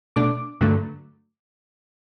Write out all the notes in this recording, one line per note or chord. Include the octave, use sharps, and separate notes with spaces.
B2 A3 D4 D6
G2 D3 F#3 A3